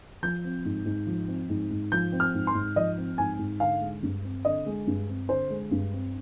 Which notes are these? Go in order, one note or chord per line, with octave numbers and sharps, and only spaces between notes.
F3 G6
C4
G#2
G#2
F3
C4
G#2
G#2
F3 G6
C4
F6
G#2
C6
G#2
F3 D#5
C4
G#2 G#5
G#2
D3 F5
G#3
G2
C4
D3 D#5
G#3
G2
C4
D3 C5
G#3
G2
C4